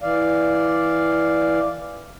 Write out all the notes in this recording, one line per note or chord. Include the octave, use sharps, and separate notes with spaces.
E3 D5 F5